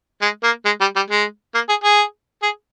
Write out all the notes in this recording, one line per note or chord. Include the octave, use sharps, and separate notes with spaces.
G#3
A#3
G#3
G3
G3
G#3
A#3
G#4
G#4
G#4